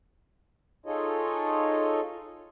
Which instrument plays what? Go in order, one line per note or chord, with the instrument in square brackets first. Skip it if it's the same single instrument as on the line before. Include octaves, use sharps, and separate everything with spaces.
[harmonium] D#4 F4 G#4 A4 C#5 D#5